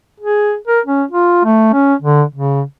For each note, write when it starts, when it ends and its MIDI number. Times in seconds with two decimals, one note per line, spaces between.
0.20 0.56 68
0.67 0.80 70
0.86 1.04 61
1.11 1.45 65
1.45 1.73 57
1.73 1.95 61
2.02 2.23 50
2.34 2.63 49